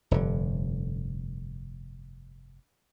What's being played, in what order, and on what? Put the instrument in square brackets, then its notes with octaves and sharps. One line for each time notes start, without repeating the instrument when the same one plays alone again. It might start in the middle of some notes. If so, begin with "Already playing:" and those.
[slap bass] F1 G2 D3